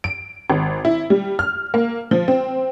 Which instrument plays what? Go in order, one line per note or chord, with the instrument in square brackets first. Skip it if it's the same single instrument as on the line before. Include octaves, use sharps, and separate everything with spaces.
[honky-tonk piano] D7
G#1
E4
G3
F6
A#3
F3
C4